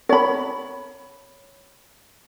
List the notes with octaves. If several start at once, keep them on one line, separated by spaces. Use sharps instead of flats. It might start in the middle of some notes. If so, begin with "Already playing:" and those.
C#5 B5